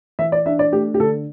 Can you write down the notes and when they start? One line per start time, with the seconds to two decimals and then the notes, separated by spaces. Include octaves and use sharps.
0.19 E3 E5
0.32 D5
0.46 D4 E5
0.59 D5
0.73 A3 G4
0.94 G4
1.00 D3 A4